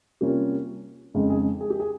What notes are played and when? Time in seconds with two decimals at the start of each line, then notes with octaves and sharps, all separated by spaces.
0.21 C3 G3 A#3 C#4 F4 G4
1.14 F2 C#3 G#3 D#4
1.30 G#4
1.61 G#4
1.70 G4
1.80 G#4